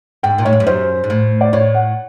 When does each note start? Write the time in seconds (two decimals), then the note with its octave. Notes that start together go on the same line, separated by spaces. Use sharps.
0.23 G#2 G5
0.38 A#2
0.45 A2 C#5
0.53 G#2
0.60 G2
0.67 F#2 C5
1.04 G#2
1.10 A2
1.41 D5
1.53 A2 C#5
1.74 F#5